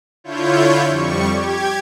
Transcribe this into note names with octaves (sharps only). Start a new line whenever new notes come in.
D3 E4 F4 C#5 G6
F2 G3 C#6
G4 G#6